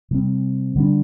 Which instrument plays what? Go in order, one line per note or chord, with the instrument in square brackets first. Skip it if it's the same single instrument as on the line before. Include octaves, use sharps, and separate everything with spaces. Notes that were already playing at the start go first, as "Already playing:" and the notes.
[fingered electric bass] C3 G3 C4
D3 G3 D4